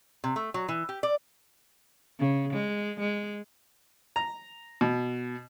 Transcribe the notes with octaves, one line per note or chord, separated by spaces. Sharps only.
C3
A3
F#3
E3
G4
D5
C#3
G#3
G#3
A#5
B2